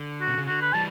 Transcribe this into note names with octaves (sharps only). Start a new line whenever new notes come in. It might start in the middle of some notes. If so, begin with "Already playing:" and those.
Already playing: D3
F#4
B2
C#3
D3 F#4
B4
E3 G3 A5